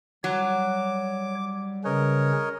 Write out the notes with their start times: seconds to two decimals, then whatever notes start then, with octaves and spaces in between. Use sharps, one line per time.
0.24 F#3 G3 C#5 D6
1.85 C#3 C#4 A#4 B4 C#5 D#5